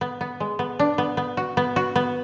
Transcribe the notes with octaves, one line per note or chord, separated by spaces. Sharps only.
B3
B3
G#3
B3
D4
B3
B3
F#4
B3
F#4
B3